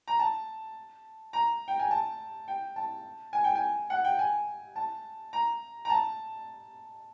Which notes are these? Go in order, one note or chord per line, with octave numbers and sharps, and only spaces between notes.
A#5
A5
A#5
G5
G#5
A5
G5
A5
G#5
G5
G#5
F#5
G5
G#5
A5
A#5
A#5
A5